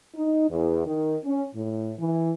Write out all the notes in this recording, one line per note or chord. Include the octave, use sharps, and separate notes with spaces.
D#4
E2
D#3
C#4
A2
E3